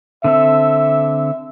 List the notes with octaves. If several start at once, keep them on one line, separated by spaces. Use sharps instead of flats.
D3 C4 A4 E5